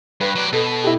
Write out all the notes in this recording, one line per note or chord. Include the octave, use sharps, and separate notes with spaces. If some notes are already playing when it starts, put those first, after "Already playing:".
G2 B4
F#3 D5
B2 A4
E4 G4